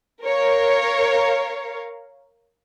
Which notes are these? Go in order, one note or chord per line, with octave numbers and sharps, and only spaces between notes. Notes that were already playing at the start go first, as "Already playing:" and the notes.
A#4 C#5 F5